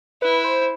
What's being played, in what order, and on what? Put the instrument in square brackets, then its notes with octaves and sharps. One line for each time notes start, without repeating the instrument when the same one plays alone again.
[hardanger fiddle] E4 [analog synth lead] B4
[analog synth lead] C5